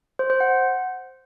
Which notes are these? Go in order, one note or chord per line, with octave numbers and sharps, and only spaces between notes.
C5
C5
F#5